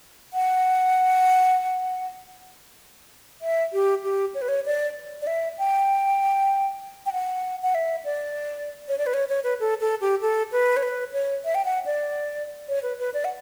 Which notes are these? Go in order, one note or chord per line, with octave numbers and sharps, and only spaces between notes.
F#5
E5
G4
G4
C#5
B4
C#5
D5
D5
E5
G5
G5
F#5
F#5
E5
D5
C#5
D5
B4
C#5
C#5
B4
A4
A4
G4
A4
B4
C#5
B4
C#5
E5
G5
F#5
D5
C#5
B4
B4
D5
F#5